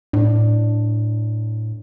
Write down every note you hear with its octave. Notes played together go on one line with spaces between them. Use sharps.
A2 D4